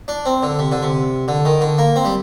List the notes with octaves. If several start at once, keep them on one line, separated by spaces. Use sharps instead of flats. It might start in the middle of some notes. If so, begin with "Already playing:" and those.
D4
C4
D3
C3
D3
C3
D3
D#3
D3
A#3
C4
G3